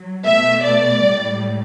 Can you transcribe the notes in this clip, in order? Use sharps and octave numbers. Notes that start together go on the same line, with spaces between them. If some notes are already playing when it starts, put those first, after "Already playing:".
Already playing: F#3
B2 A3 E5
D5
A2 G3